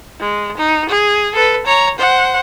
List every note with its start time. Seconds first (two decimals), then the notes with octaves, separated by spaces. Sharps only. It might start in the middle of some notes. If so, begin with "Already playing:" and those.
0.20 G#3
0.58 D#4
0.89 G#4
1.35 A4 B4
1.66 C#5 A#5
1.98 C5 F#5